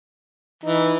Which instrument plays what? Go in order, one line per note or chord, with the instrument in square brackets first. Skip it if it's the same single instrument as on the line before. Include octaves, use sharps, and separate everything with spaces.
[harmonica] E3 [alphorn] D#4